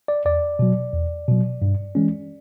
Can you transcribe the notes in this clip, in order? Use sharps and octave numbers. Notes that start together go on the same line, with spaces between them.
D5
E2 D5
B2 F#3
E2
B2 F#3
G2
E3 G#3 C#4